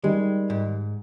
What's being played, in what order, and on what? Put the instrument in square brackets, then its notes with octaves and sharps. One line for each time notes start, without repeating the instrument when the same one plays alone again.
[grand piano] D#3 G3 [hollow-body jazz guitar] G#3
[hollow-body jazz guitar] G#2